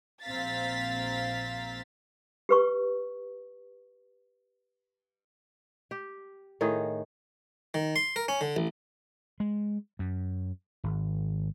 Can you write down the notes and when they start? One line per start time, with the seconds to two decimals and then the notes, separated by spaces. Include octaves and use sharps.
0.23 A#1 C4 F5 A#5 A6 B6
2.49 G4 B4 C#6
5.91 G4
6.61 A2 D#3 D#4 G#4
7.74 D#3
7.96 C6
8.16 A#4
8.28 C#4
8.41 D3
8.56 A1
9.40 G#3
9.99 F#2
10.84 G#1